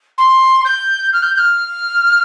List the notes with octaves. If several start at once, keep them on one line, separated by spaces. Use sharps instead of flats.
C6
G6
F6
G6
G6
F6